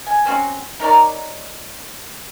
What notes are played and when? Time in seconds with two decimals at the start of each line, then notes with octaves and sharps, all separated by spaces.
0.07 G#5
0.26 C4 C#4 F#4
0.80 D#4 A#4 C#5 D5